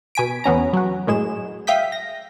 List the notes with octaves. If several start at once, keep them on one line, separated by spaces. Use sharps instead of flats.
B2 G#5 B6 D7
E2 B3 C#4 A#5
F#3 F#4
F#2 A2 G#3 G#4 E7
E5 F5 G5 D#6 G6 B6
A#6